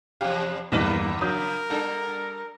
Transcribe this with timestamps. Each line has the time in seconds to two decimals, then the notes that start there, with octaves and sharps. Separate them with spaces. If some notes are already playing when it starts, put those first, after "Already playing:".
0.21 E2 C3 G4 F5
0.72 A#1 E2 G2 D3 A#3 B4 D6
1.21 C#3 F#3 A#4 D#6 G6
1.70 G3 D4 A4